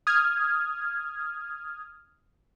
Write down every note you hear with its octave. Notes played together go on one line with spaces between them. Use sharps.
D#6 F6 G#6